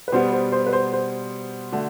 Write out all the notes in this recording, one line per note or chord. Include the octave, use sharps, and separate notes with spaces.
B4
B2 G3 B3 C5
C5
C5
B4
C5
C5
D3 A3 D4 F#4